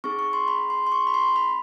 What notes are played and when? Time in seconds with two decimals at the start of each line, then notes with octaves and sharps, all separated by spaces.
0.04 C4 D#4 G#4 C#6
0.19 C#6
0.33 C6
0.48 B5
0.70 C6
0.87 C6
0.92 C#6
1.07 B5
1.14 C6
1.36 B5